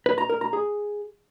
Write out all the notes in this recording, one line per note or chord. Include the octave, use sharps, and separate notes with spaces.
B4
A#5
A#4
A#5
G#4